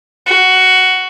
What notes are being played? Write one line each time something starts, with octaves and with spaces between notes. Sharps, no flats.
F#4